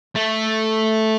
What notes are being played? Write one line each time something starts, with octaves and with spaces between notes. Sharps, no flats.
A3